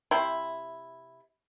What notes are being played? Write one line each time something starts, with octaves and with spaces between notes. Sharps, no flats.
C3 E4 C6